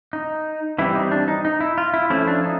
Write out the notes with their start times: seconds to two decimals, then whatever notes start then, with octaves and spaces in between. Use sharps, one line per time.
0.13 D#4
0.78 E3 G3 C4 E4
0.95 D#4
1.12 D4
1.28 D#4
1.45 D#4
1.61 E4
1.78 F4
1.94 E4
2.10 F3 A3 C#4 E4
2.27 D4
2.44 D#4